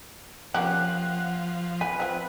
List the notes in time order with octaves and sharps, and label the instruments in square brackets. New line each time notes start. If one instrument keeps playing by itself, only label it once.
[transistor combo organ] F3 [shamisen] A#3 C#4 G4 [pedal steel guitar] F#5
[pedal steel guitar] B4 [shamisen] G#5
[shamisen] C4 F4